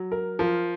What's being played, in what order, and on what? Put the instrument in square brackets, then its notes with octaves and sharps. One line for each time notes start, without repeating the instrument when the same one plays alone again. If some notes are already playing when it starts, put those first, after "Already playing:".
Already playing: [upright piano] F#3
A#4
[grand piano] F3 [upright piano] A#4